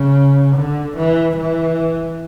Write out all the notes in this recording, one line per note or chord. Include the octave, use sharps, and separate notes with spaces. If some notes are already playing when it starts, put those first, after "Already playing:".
Already playing: C#3
D3
E3
E3